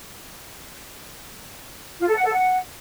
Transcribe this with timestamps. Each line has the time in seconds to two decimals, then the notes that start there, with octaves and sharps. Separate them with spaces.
2.00 F4
2.08 A4
2.16 F#5
2.24 A4
2.33 F#5